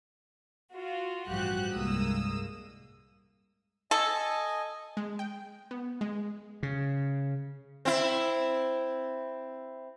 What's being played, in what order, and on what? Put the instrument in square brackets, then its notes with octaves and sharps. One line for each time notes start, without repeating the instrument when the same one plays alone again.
[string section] F4 F#4
A1 G2 F3 F#4 G4 F#6
C2 G2 G#3 A#3 D#6 E6
[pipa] A4 [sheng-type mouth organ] D#5 G#5
[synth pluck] G#3
G5
B3
G#3
[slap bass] C#3
[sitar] C4 E4